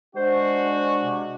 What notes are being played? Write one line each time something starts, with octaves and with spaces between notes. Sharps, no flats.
G#3 D4 F#4 C5
C3